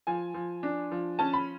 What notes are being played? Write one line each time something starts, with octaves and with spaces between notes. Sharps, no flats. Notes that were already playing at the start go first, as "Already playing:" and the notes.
F3 G#5
F3
D4
F3
C#4 A5
B5